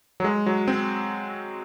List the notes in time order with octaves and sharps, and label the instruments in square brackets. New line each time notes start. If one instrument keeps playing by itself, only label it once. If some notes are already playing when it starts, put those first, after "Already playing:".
[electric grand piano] F#3
G#3
F#3
C4